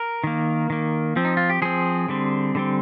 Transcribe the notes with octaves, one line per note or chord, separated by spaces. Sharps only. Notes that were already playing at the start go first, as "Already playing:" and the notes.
Already playing: A#4
D#3 A#3
D#3 A#3
F3 C4
D#4
F4
G4
F3 C4 G#4
D3 G3 C4
D3 G3 C4